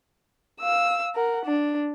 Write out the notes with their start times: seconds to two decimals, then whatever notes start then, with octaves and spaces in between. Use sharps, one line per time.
0.61 F5 E6
1.15 A#4 F#5
1.46 D4